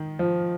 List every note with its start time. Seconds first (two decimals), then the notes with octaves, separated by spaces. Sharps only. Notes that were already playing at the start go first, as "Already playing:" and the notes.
Already playing: D#3
0.19 F3